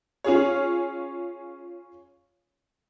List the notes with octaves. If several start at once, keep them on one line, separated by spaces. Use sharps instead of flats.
C#4 F4 G#4 C#5